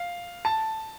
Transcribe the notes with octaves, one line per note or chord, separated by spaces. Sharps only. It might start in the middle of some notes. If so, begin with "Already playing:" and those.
Already playing: F5
A5